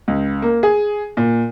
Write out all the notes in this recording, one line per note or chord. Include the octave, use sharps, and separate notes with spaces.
C#2
A#3
G#4
A#2